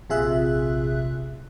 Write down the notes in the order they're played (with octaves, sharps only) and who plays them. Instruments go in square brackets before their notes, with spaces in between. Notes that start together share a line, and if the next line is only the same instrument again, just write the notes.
[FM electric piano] A#1 C3 F4 G#4 E5 F#6